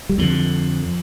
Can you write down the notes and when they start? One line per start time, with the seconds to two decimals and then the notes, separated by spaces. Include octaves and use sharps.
0.09 G3
0.18 F2 D3 F3